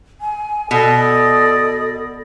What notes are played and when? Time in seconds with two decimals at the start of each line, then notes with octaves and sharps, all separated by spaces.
0.21 G#5
0.71 B2 A4 D5 D#5 D#6